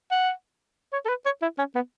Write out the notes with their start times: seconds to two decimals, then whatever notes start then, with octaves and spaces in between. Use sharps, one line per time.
0.11 F#5
0.93 C#5
1.05 A4
1.09 B4
1.25 C#5
1.42 E4
1.58 C#4
1.75 B3